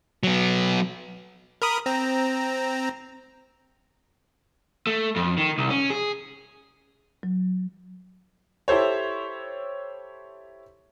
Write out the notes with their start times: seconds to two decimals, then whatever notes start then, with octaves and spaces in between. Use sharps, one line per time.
0.23 F#3 B3
1.62 A#4 B5 D#6
1.86 C4 A#5
4.87 A3
5.16 F2
5.38 D#3
5.58 C2
5.70 C#4
5.90 G#4
7.23 F#3
8.68 E4 G4 A4 C5 C#5